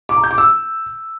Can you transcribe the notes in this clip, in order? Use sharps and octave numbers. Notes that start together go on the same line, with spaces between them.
D6
A#5
G6
D6
E6